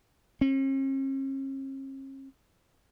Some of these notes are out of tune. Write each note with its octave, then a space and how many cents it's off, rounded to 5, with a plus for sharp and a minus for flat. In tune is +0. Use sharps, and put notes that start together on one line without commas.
C#4 -45